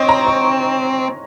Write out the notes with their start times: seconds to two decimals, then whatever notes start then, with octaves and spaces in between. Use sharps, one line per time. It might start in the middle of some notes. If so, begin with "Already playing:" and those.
Already playing: C4 C#5 D#5 C6
0.09 A#5
0.27 C#6